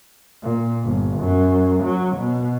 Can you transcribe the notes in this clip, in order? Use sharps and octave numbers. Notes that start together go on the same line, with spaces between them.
A#2
G1
F#2
F#3
B2